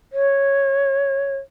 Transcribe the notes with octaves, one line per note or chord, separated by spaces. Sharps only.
C#5